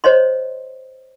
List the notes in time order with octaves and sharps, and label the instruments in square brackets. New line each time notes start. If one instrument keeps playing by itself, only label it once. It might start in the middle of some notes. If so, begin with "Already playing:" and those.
[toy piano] C5 C#5 D#5 C6